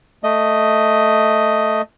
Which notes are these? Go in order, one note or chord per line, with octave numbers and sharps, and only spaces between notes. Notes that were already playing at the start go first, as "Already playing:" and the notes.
A3 D#5